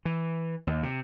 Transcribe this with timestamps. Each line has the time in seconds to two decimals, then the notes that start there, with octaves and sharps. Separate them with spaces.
0.05 E3
0.67 D#2
0.83 C3